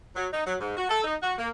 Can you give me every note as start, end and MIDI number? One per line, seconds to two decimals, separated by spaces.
0.16 0.27 54
0.33 0.41 63
0.45 0.56 54
0.60 0.73 44
0.77 0.85 66
0.89 1.03 69
1.04 1.15 63
1.21 1.33 66
1.38 1.48 58